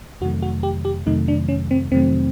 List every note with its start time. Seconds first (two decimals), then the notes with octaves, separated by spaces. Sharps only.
0.21 F2 C3 D#3 F#3 A3 F#4
0.42 F#4
0.63 G4
0.85 G4
1.06 F2 C3 D#3 F#3 A3 D#4
1.28 D4
1.48 C#4
1.71 C4
1.92 F2 C3 D#3 F#3 A3 C4